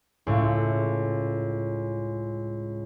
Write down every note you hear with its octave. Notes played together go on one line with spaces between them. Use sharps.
C#2 A2